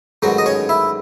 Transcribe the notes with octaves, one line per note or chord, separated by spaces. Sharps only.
A1 G#2 D#3 F#3 F#4
D#5
C#4 C#5
E4 E5